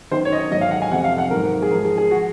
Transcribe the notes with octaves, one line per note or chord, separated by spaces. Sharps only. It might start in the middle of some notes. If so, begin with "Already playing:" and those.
F#2 D#3 F#3 C5
C#5
D#5
C#5
G#2 D#3 F#3 D#5
F5
F#5
G#5
F2 C3 F3 F#5
F5
F#5
G#2 D#3 F#3 A#4
G#4
G#2 F3 A#4
G#4
G#4
F#4
F3